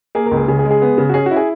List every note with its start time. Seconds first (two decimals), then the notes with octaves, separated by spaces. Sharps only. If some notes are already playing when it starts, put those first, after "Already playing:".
0.15 A#3 G#4
0.26 A#4
0.31 C#2
0.37 G#4
0.48 C#3 G#4
0.59 G#4
0.65 G#3
0.71 G#4
0.82 B3
0.98 C#3
1.09 F#4
1.14 C#4 G#4
1.26 F#4
1.31 E4
1.36 G#4